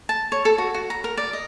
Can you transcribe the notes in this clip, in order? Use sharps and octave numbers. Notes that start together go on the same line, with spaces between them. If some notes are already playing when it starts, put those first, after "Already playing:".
A5
C#5
A4
F#4
F#4
A#5
A#4
D5
D#5